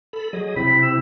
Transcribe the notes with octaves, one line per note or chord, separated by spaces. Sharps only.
A4 B5
F#3 G#4 D#5
C3 C4 E4 B5
E6